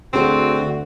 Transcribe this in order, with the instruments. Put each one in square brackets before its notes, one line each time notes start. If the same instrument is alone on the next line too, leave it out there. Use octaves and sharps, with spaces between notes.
[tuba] D2 [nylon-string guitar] D3 G#4 C5 [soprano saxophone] C4 [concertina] F#4